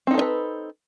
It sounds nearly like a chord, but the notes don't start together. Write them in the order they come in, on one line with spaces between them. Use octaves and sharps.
C4 D#4 A4 D4 B4